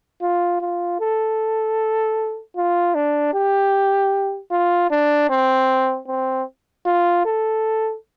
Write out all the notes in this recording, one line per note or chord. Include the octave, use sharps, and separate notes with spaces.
F4
F4
A4
F4
D4
G4
F4
D4
C4
C4
F4
A4